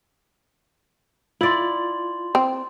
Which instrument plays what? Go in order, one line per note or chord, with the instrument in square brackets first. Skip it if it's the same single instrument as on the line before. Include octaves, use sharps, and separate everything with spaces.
[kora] E4 D5 [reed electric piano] F4 [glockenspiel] C6 A6 F#7
[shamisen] C4